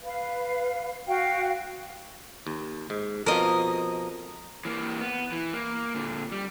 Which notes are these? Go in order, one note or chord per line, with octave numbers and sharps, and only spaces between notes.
B4 F5
F#4 F5 G5
D#2
G#2
F2 B2 F3 A#4 D#5
E3 A#3
B3
E3
A#3
A#2 D3
G3